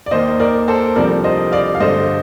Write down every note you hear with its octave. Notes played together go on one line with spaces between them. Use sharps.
D5
D#2 D#3 A#3 C5 D#5
A#4 D5
A4 C5
C2 C3 F3 A3 D4 A#4 D5
C5 D#5
D5 F5
F5
G2 D3 A3 C5 D#5